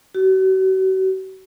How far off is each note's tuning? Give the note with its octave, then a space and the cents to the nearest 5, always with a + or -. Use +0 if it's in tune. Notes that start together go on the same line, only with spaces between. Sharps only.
F#4 +40